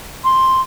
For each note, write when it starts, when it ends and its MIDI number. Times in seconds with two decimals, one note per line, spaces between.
0.24 0.61 84